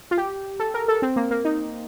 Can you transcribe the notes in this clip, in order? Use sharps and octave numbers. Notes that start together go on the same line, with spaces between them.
F4
G4
A4
A#4
A4
C4
A#3
A#3
D#4